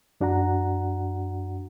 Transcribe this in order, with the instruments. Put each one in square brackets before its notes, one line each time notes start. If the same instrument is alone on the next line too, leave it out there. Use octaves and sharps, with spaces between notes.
[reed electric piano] F#2 D4 F#4 F#5 A#5